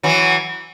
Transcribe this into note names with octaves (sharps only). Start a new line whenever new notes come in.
E3 F#3